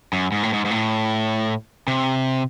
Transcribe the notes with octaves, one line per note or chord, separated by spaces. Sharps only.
F#2
G#2
A2
G#2
G#2
A2
C3